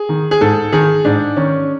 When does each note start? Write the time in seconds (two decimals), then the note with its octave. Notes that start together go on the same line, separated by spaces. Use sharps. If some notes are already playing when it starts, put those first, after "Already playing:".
Already playing: G#4
0.09 D#3
0.31 G#4
0.41 G#2 A4
0.72 D#3 G#4
1.05 G#2 D4
1.37 D#3 C#4